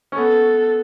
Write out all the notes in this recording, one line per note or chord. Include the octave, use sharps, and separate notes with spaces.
C#4
B3 A4